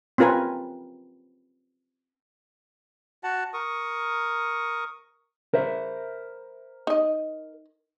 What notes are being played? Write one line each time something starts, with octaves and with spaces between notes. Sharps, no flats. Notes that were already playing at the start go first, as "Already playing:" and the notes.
C4 C#4 F4 A#4 B4 G#5
F#4 F#5 A5
A#4 C#6 D#6
A#4 C5 E5
D#4 D#5